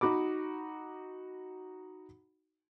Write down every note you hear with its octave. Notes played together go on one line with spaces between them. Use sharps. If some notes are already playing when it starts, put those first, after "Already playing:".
D#4 F#4 B5 D6